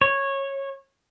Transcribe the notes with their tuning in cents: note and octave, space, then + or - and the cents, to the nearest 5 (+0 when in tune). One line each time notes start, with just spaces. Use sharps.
C#5 -15